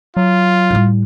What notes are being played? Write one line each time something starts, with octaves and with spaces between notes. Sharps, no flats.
F#3 F4
A2 G3